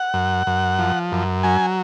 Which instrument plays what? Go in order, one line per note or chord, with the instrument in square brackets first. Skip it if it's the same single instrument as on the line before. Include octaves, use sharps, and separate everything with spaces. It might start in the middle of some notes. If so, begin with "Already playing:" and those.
Already playing: [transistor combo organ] F#5
F#2
F#2
F3
F#2
F#3 G#5